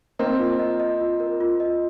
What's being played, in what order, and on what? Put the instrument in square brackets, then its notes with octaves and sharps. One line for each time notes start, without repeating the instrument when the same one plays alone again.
[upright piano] A#3 C4 [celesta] D#5
[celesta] F4
D#5
D#5
F4
A#4
F4
D#5